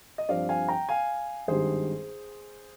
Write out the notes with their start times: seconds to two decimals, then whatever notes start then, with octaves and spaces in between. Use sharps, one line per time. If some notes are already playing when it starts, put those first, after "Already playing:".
0.18 D#5
0.29 G2 F3 C4 D5 F5
0.49 F5 G#5
0.69 G5 A#5
0.89 F5 G#5
1.48 G#1 G2 D#3 G3 G#4 C5